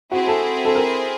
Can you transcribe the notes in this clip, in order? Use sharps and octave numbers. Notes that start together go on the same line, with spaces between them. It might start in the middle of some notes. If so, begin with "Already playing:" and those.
C4 E4 F#4 G#4
A4
A4
A#4